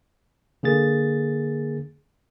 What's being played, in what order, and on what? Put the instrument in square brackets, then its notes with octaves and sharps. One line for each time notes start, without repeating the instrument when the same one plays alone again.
[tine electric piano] D3 A#3 G#4 A6